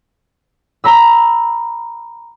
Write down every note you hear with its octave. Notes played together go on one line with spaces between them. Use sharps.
A#5 B5 E6